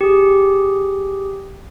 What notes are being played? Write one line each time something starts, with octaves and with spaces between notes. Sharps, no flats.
G4 G#4